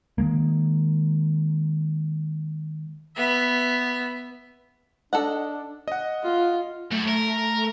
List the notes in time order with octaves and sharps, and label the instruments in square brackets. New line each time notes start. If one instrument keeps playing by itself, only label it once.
[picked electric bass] D#3 F#3 G#3 A#3
[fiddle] B3 E5
[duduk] D4 [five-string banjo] A4 D#5 F#5
[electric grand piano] D#5 F#5
[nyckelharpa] F4
[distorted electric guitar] F#2 [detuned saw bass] A3
[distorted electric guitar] A#4